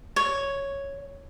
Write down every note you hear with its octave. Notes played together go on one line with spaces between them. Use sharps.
C#5